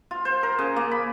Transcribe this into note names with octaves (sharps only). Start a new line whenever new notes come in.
F4
C5
A#4
C#3
A#3
B5